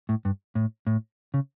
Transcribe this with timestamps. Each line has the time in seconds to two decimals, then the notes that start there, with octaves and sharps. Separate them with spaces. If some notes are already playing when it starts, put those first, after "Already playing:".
0.09 A2
0.25 G2
0.55 A2
0.87 A2
1.34 C#3